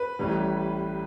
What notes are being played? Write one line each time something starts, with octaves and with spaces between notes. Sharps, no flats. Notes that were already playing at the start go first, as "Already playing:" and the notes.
Already playing: B4
A1 A2 E3 G3